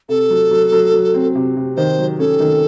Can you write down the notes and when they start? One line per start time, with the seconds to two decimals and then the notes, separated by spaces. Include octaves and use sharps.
0.09 C3 A4
0.30 F#3
0.51 F#3
0.72 F#3
0.94 F#3
1.14 C4
1.35 C3
1.57 C3
1.77 D#3 C5
1.98 F#3
2.19 C#4 A4
2.40 D#3